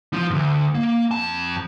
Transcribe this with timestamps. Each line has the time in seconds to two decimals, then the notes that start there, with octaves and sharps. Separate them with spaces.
0.13 F3 F4
0.30 D2 G#2
0.75 A#3
1.11 F2 A5